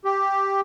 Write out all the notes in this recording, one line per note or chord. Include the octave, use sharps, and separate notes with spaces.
G4